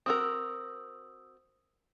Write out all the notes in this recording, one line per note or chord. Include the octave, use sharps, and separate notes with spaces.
C4 F#4 A#4 D#6 E6